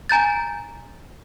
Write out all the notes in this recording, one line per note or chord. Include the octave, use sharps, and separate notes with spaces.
G#5 A#5 G6 A6